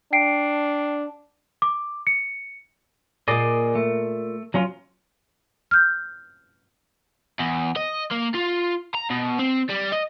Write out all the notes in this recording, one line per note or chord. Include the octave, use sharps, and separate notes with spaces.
D4 G5 C7 D7
D6
C#7
A#2 A#3 G#4 D5 D#5
A3
F#3 C#4 F4
F6 G6
E2
D#5
A#3
F4
A#5
B2
C4
G3
D#5